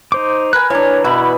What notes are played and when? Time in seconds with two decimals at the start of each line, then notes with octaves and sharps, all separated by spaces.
0.12 D#4 C5 D6
0.53 A#4 B4 G#5 F#6
0.70 E3 D4 C#5
1.04 B2 E4 F#4 B5